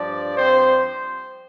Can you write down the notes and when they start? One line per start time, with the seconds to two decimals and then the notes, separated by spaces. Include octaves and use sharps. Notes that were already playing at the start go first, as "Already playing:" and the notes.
Already playing: G2 F3 D4 D5
0.36 C4 C5